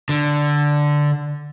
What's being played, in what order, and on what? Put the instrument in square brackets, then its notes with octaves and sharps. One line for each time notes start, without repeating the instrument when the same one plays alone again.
[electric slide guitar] D3